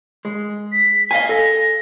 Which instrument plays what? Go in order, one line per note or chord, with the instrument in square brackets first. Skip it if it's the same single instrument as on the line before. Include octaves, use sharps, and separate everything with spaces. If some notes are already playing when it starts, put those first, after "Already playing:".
[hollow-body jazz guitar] G#3
[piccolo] B6
[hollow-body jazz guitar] D#5 F5 G#5
[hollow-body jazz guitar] A4 [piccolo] A#6